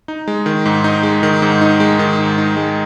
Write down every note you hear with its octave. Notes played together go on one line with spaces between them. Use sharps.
D#4
G#3
D#3
G#2
D#4
G#3
D#3
G#2
D#4
G#3
D#3
G#2
D#4
G#3